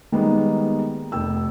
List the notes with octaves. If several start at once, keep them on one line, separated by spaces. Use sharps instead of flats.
D#3 G3 G#3 A#3 B3
F1 G5 E6